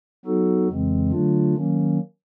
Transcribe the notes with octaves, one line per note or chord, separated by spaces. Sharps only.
F#3 B3 D#4 F#4 A4
F2 C#3 E3 G#3 C4
D3 F#3 A3 D4 F4
D#3 F#3 A#3 C#4